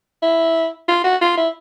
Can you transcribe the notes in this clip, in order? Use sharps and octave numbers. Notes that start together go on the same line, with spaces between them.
E4
F4
F#4
F4
E4